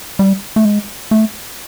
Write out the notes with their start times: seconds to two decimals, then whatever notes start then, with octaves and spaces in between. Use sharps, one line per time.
0.19 G3
0.56 A3
0.65 G#3
1.11 A3